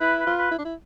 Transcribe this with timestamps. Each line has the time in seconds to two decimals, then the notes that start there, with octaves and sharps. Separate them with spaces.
0.01 E4 B4
0.20 B4
0.27 F4
0.38 B4
0.51 E4
0.58 D4
0.65 E4